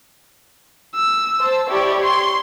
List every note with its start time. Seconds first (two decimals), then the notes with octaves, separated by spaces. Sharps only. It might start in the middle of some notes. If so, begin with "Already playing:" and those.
0.96 E6
1.39 C5 A5
1.69 E4 G4 C#5 D5
2.02 C6